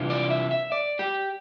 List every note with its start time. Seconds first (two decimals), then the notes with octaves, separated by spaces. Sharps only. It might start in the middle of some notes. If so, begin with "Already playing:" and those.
Already playing: C3 E3 G3 D4 F4
0.10 D5
0.30 E5
0.51 E5
0.72 D5
0.99 G4